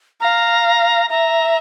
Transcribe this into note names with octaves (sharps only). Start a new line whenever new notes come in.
F5 A#5
E5 A#5